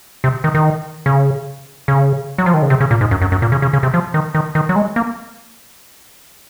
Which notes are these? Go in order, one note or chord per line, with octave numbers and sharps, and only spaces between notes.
C3
D#3
D#3
C#3
C#3
F#3
F3
D#3
C#3
C3
C#3
A#2
G#2
F#2
F#2
F#2
A#2
C#3
C#3
C#3
C3
F3
D#3
D#3
D#3
F#3
G#3
A#3